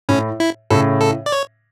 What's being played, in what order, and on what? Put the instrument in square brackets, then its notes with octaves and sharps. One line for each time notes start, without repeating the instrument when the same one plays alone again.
[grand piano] A2 [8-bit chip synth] C#4
[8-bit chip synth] E4
[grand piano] A2 C#3 [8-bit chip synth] A4
[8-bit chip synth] A4
D5
C#5